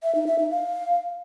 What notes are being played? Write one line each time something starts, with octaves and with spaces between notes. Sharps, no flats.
E5
D#4
E5
D#4
F5